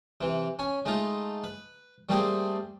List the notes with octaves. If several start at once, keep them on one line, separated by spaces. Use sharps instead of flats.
C3 E3
C#4 G#5
G#3 A3 D#4 F4
B4
G3 A3 A#3 C4 G4 G#4